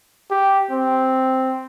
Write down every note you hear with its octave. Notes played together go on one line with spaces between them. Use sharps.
G4
C4